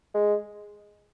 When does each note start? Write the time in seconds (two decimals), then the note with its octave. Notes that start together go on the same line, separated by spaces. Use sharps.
0.14 G#3